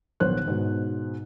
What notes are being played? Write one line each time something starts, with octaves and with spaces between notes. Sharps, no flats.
A#1 D#2 B3 C5 C#5 F#6
G#2 B2